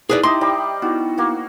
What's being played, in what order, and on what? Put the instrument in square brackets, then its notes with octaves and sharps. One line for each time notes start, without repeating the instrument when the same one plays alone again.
[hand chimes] D#4 E4 [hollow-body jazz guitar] G#4 B4 D5
[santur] G4 D#5 D#6 [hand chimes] E5 G5 A#5 [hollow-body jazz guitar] C6
[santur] G3 C5 B5
[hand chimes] B3 D#4 E4 [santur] F#4
[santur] A#3 F#4